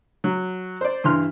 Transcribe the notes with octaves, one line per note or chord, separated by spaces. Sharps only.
F#3
C5 D5
G2 E3 C6 F6